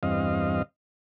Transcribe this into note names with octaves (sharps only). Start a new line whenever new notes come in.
E2 G2 C4 D#5 F5